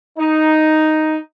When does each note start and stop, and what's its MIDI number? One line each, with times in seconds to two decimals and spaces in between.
0.19 1.17 63